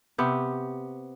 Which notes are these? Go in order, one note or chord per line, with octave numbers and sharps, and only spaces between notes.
C3 B3 G4